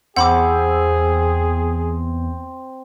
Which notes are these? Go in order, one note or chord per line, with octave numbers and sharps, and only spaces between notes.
E2 C4 G#4 F#5 B5 D6